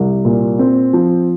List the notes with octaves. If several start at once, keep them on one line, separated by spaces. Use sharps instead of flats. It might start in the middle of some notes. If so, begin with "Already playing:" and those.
Already playing: C2
A#2
C4
F3